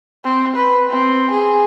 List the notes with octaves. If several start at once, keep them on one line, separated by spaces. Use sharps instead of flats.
C4
B4
C4
G#4